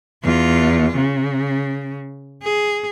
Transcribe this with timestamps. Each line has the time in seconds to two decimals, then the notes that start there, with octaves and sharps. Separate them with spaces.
0.24 E2 F4
0.96 C#3
2.43 G#4